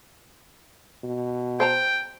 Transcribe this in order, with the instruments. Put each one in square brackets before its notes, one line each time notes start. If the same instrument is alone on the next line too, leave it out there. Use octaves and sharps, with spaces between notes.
[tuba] B2
[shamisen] C5 A5 A#5 [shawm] G5